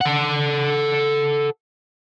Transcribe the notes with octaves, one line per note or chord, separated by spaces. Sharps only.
A4 F#5